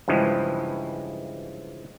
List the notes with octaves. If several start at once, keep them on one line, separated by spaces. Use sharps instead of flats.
G2 C#3 E3 F3 G#3